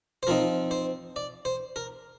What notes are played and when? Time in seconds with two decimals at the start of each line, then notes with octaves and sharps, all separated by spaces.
0.23 C5
0.27 F3 C4 D#4 A#4
0.71 C5
1.16 D5
1.45 C5
1.76 A#4